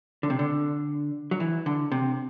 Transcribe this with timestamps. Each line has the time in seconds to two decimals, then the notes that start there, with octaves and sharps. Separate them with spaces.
0.23 D3
0.30 C3
0.39 D3
1.31 F#3
1.40 E3
1.66 D3
1.92 C3